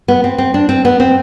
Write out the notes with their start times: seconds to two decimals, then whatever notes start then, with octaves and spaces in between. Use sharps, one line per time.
0.08 B3
0.24 C4
0.38 C4
0.54 D4
0.69 C4
0.85 B3
1.00 C4